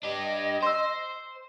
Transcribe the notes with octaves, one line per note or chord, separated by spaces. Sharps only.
D4 G4 D#5
C5 C6 E6